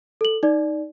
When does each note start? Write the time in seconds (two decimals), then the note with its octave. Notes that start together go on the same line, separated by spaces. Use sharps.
0.21 A4 F#7
0.43 D#4 D5